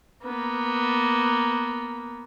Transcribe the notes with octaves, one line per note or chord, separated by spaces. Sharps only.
A#3 B3